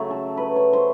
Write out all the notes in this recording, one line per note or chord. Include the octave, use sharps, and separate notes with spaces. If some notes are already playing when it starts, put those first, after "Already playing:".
Already playing: C#3 F#3 A3
A4
B4
C#5
C5